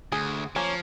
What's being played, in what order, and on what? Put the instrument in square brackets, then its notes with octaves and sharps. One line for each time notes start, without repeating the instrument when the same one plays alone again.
[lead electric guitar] D2 [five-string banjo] G#4
[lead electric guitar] F3 [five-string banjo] A#3 C#4